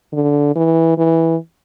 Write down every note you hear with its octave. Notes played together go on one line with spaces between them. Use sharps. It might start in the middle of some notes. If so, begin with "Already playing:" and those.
D3
E3
E3